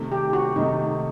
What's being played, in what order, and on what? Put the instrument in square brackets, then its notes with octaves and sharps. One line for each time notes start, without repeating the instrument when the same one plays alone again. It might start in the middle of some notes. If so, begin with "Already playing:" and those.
Already playing: [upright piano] C3 D#3 A3
[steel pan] G4
F#4
[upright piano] C3 D#3 A3 [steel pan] D#4